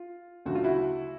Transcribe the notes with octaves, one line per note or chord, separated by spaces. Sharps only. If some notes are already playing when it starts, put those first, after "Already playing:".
Already playing: F4
D2 C#3 F#3 A3 F#4
F4
E4 F#4